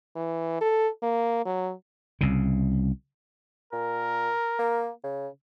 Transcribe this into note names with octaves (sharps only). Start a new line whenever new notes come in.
E3
A4
A#3
F#3
C2 C#3
A#2 A#4
A#3
C#3